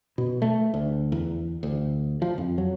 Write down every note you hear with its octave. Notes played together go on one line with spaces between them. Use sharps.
B2
A3
D2
E2
D2
F3
F2
F#3